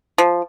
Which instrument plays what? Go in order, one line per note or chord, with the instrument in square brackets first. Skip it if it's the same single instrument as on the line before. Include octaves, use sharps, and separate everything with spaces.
[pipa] F3